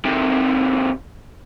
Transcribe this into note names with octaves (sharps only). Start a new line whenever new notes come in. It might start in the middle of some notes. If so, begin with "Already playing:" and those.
C3 D#3